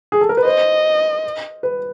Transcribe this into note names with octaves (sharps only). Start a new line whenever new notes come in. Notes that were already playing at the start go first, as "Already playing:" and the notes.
G#4
A4
A#4
B4
C5 D#5
B4